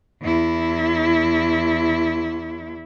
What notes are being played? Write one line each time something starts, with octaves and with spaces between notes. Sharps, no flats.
E2 E4